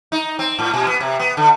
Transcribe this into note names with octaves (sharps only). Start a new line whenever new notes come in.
D#4
C4
A2
B2
B3
C3
B3
D3